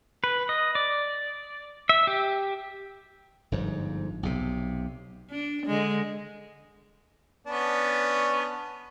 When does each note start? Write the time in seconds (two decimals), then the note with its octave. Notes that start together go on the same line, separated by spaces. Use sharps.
0.24 B4
0.49 D#5
0.75 D5
1.89 E5
2.07 G4
3.52 G1 G#2 F3
4.23 B1 C3
5.31 D4
5.66 D3 G#3
7.47 B3 C#4 D4